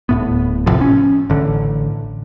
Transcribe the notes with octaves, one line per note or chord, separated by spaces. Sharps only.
D1 A2 B3
A1 A2 C3 F3
C#4
A1 D3